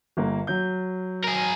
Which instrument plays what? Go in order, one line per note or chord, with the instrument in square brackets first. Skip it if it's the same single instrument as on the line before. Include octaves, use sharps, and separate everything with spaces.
[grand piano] G1 A#3
F#3 G6
[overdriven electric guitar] G#4 A#4